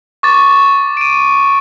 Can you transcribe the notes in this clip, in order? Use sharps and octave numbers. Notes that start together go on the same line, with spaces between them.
C#6 D6 A6
D7 D#7